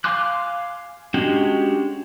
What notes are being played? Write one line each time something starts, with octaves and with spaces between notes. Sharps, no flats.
F5 G#5 C6 D6 F#6
G#3 C#4 D4 F#4 G4